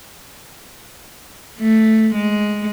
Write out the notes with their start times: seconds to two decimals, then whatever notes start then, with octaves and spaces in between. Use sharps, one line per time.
1.60 A3
2.15 G#3